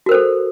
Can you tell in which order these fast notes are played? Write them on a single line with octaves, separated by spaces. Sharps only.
F#4 A#4 C5 A4